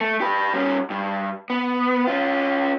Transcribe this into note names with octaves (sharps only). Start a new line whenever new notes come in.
A3
G4 B4
G3 C#4
G2
B3
C#4 F4